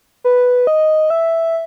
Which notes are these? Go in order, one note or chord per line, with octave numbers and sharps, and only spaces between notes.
B4
D#5
E5